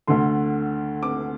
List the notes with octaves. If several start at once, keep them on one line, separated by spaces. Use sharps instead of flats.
D2 D3 A3 C6
D6